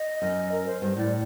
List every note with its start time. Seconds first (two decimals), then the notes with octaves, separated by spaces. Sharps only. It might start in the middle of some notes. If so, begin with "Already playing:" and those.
Already playing: D#5
0.22 F#2
0.52 A#4
0.66 C5
0.82 G2 C5
0.97 A2 D5